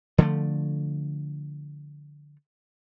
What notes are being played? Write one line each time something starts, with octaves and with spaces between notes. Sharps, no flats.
D3 F3 G3 A3